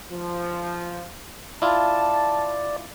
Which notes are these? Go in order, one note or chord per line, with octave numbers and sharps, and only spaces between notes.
F3
E4 F4 D5 A5